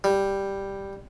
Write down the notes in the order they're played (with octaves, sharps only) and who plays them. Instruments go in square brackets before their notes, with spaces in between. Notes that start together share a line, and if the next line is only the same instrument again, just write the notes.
[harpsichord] G3